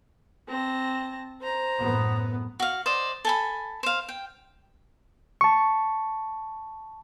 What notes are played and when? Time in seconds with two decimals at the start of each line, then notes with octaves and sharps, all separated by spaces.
0.48 C4 A5 A#6
1.41 C5 A#5
1.81 F#2 A2 B3
2.60 F#4 F5
2.86 C5 D5 D#5
3.25 A4 G#5 B5
3.83 C5 F5
4.09 G5
5.41 A5 C#6